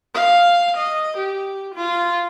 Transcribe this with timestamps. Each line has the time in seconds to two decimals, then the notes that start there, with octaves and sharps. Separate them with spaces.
0.15 F5
0.77 D#5
1.18 G4
1.75 F4